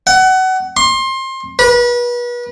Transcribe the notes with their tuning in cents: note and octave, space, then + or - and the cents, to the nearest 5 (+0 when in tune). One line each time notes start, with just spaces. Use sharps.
F#5 +25
C6 +25
B4 -35